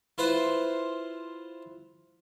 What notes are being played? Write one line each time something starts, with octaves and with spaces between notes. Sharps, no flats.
E4 F4 B4 C5